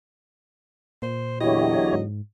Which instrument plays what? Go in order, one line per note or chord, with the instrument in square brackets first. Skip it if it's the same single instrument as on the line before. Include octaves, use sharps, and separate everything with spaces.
[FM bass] A#2 [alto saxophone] C5
[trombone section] E2 D3 F#3 [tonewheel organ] E4 G4 C#5 [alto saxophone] D#5
[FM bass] G#2